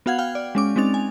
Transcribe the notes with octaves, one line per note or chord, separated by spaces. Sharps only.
B3 F#4 F5 F#5 G#6
F5 G5 F6
D5
G#3 C#4 D6
G#3 C4 C#4 D#4 A6 F7
G#5